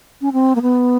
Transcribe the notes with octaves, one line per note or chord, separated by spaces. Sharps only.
C#4
C4
A#3
B3